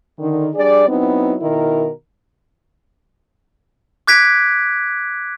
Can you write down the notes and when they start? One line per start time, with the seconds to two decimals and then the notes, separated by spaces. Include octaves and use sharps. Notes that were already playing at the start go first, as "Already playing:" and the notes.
0.19 D3 D#3
0.55 G3 D4 G#4 D5
0.88 F#3 B3 C4 D#4 E4
1.41 B2 D#3 E4 A#4
4.07 D6 F#6 G#6 B6 D7